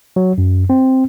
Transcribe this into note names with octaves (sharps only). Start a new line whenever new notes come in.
F#3
F#2
C4